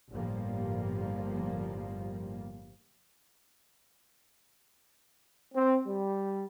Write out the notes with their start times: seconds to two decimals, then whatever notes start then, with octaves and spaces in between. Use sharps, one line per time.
0.11 G1 A2 F3 G3 A#3
5.55 C4
5.86 G3